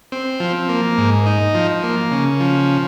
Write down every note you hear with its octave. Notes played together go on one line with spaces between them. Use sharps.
C4
F3
A#3
G#2
D#4
F3
A#3
C#3
F3